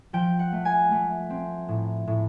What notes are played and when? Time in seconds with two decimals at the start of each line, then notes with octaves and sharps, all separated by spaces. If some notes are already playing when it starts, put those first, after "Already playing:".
0.13 F3 G5
0.39 F#5
0.52 A3
0.65 G#5
0.91 A3
1.30 C4
1.69 A2
2.07 A2